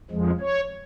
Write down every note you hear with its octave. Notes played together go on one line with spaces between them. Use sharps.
F2 F3 G#3
C#5